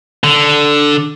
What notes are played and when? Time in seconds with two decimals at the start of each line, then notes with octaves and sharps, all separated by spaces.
0.24 D3